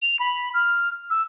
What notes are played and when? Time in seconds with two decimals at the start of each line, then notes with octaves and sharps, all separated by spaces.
0.02 F7
0.19 B5
0.54 F6
1.10 E6